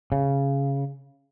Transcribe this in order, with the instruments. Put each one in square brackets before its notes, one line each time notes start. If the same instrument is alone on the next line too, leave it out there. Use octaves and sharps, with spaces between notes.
[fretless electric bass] C#3